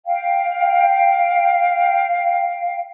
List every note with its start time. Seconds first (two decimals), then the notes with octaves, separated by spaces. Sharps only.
0.06 F5 G5